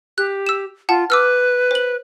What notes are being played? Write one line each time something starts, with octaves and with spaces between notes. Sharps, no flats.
G4 F#6
E6 E7
F4 F#5 A5
B4 D6 E6 F6
C5 F#7